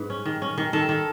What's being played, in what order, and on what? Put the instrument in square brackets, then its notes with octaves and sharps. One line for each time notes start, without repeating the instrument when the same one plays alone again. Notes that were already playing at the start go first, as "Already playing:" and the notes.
Already playing: [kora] G#2 [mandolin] B4
[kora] C#4
D#3
C#4
D#3
[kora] D#3 [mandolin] A4
[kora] D#3